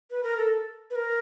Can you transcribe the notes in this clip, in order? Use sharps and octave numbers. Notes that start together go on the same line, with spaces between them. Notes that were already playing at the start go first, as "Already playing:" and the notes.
B4
A#4
A4
B4
A#4